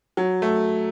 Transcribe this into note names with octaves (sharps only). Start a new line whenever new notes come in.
F#3
A3